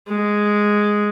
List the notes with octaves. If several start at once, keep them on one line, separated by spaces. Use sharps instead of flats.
G#3